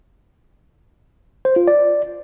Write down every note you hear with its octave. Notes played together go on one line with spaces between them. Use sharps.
C5
F4
D5